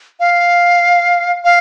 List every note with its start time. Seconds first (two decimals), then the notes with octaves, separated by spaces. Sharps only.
0.20 F5
1.45 F5